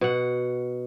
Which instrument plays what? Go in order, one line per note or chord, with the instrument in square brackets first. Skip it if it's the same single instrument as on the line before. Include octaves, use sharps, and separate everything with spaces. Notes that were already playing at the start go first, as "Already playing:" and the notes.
[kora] B2 F#5